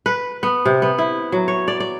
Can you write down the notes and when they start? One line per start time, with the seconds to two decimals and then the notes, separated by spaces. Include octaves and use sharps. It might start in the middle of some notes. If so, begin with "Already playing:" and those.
0.06 B4
0.43 B3
0.65 C3
0.82 B3
0.98 E4
1.32 F#3
1.48 C#5
1.68 D5
1.80 D5